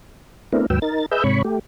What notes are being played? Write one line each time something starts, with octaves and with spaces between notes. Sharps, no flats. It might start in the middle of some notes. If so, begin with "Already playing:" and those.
A3 B3 C4 D4 E4 A#4
D#2 G#2 F#3 B4 G5 E6
D#4 A#4 A6
G#4 B4 D#5 E5 E6 G6
G#2 C3 C#5 B5 C#6
A3 G4